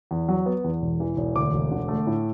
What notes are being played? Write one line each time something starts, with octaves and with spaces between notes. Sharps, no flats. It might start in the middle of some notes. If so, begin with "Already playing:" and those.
E2
F#3
B3
E2
E1
E3
E1
D2 D6
E1
D3
A3
A2